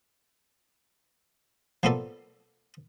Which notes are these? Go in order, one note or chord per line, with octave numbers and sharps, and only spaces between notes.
F3 A#3 B3 A4 D5